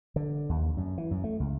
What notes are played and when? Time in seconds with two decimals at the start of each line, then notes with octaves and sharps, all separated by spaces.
0.16 D3
0.49 D#2
0.77 F#2
0.98 E3
1.11 F#2
1.24 A3
1.40 C#2